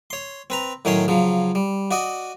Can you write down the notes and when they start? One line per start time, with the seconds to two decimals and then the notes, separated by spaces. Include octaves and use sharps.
0.10 C#5 C6
0.50 C4 B4 A#5
0.85 A2 D#3 F#3 C#4 C#5 C6
1.08 C#3 F3 F#3
1.55 G3
1.91 F#4 D5 D#5 F#5